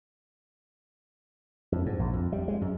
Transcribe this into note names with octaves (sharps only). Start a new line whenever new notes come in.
F2
G#2
A#1
F2
G3
G#3
F#2